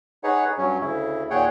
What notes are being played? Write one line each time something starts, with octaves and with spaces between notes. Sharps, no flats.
D#4 G#4 B4 C#5 F#5
G2 F#3 C#4
D2 C#3 E4
D#2 A#2 G#4 C#5 F#5 G5